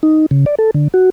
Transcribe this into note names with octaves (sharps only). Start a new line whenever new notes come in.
D#4
C#3
D5
A4
D3
F#4